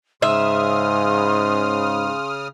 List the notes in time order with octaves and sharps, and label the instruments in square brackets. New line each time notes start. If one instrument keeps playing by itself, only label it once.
[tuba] G#2 [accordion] C#3 D#6 F6 [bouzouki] E5 [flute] C6